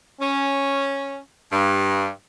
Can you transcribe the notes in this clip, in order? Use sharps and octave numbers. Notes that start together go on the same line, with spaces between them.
C#4
G2